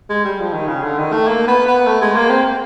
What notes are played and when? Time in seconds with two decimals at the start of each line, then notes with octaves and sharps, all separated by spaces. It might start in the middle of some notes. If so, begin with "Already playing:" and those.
0.10 G#3
0.25 G3
0.40 F3
0.53 D#3
0.68 C#3
0.83 D3
0.98 D#3
1.12 A3
1.27 A#3
1.47 B3
1.66 B3
1.87 A3
2.02 G#3
2.16 A#3
2.30 C4